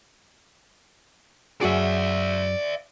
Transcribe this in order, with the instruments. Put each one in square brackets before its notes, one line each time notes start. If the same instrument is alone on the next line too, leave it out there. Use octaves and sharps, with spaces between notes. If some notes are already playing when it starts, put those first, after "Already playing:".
[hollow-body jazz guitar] F#2 F#4 G#4 [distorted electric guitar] D5 E5